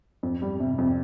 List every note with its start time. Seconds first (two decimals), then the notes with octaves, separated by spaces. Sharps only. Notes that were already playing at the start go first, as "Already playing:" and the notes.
0.23 F2
0.42 G3
0.60 C3
0.78 F2